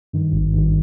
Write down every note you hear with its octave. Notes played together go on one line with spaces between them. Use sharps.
G2 D#3
G#1
G2 D#3